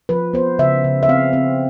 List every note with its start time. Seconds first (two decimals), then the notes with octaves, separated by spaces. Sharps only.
0.09 F3 B4
0.33 B3 C5
0.59 C#3 E5
0.84 C#3
1.03 E5
1.09 C4 F5
1.33 C4